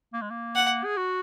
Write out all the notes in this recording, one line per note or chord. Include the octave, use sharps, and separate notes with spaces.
A#3
G#3
A#3
F#5
G#4
F#4